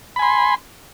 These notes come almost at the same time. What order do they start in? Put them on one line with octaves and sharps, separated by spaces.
B5 G#5 C6